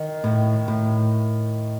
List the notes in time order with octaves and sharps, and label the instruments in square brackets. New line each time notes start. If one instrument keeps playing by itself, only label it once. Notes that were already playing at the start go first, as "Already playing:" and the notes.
Already playing: [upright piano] D#3
[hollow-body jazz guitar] A2
A2